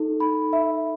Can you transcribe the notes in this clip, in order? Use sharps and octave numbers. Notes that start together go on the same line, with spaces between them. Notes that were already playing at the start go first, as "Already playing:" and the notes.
Already playing: D#4 A4
B5
E5